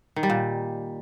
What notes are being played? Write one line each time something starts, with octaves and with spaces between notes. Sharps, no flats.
D#3
G3
A#2